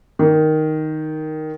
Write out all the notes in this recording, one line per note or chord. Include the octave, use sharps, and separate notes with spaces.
D#3